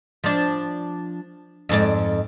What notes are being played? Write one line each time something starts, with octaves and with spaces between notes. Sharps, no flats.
F3 D4
F2 G#2 D5